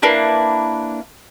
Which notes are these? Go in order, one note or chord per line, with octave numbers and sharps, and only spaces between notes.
A#3 D4 E4 B4